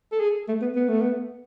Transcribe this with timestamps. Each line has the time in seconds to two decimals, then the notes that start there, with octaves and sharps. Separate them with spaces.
0.12 A4
0.20 G#4
0.48 A3
0.61 B3
0.76 B3
0.89 A3
1.01 B3